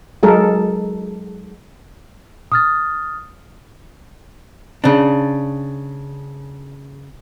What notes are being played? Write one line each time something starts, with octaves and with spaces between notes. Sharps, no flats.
F#3 G#3 A4 A#4
D#6 F6 A6
C#3 D4